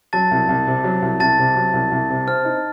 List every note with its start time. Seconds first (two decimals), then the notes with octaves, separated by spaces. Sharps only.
0.13 F#3 A5 A6
0.31 C2
0.49 C2
0.67 C3
0.84 F#3
1.02 C2
1.20 C2 A5 A6
1.39 C3
1.56 F#3
1.74 C2
1.91 C2
2.09 C3
2.27 C4 F6
2.45 D#4